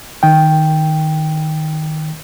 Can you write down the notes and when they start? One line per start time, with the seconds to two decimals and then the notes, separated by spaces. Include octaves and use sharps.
0.23 D#3 G5